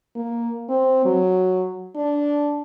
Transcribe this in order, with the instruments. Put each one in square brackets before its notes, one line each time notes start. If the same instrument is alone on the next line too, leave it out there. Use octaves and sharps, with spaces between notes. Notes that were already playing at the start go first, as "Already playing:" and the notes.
[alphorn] A#3
C4
F#3
D4